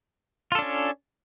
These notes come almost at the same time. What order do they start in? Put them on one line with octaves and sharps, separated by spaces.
F4 A4 D4 C#4